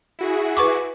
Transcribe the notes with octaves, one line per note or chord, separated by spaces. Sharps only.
E4 F#4 G#4
B4 C#6 D6